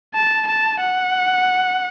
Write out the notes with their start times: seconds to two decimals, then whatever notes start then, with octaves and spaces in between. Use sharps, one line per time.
0.15 A5
0.47 A5
0.80 F#5